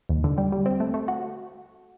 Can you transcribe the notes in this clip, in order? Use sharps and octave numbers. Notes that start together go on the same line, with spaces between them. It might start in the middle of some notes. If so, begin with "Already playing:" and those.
D#2
D3
G3
G3
C4
A3
A3
F#4